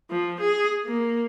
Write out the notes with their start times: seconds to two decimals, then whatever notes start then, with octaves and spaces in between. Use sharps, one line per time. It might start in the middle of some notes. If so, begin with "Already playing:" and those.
0.10 F3
0.40 G#4
0.85 A#3